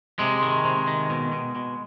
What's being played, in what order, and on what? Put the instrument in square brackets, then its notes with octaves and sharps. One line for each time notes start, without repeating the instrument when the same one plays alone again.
[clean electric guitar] C3 G#3
D#3
C3
D#3
B2
B2
B2